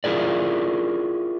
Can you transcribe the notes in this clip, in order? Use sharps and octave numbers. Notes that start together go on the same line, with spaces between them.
E4 F4 G#4 A#4 D5